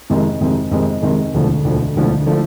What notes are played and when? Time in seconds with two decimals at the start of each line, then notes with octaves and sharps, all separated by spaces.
0.10 F2 C3 D#3 G#3
0.40 F2 C3 D#3 G#3
0.71 F2 C3 D#3 G#3
1.02 F2 C3 D#3 G#3
1.34 E1 D2 D3 F3 A3
1.64 E1 D2 D3 F3 A3
1.95 E1 D2 D3 F3 A3
2.26 D3 F3 A3